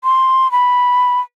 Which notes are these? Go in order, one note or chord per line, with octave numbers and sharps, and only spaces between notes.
C6
B5